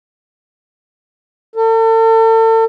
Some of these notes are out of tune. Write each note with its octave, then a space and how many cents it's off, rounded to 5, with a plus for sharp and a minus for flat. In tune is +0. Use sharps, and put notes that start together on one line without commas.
A4 +40